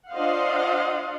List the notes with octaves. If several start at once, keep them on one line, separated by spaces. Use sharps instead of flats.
D4 F4 C5 D#5 F5 F#5